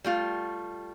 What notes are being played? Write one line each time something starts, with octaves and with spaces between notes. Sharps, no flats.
G3 A3 F4